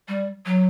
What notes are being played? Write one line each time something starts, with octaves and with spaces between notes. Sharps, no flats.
G3
F#3